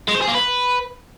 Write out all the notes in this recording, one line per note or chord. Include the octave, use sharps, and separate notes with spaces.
G#3
C5
G#4
A#3
B4